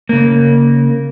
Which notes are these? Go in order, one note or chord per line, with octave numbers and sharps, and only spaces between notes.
C#3 A#3